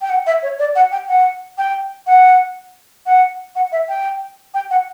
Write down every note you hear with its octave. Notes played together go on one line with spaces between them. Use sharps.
G5
F#5
E5
C#5
D5
F#5
G5
F#5
G5
F#5
F#5
F#5
E5
G5
G5
F#5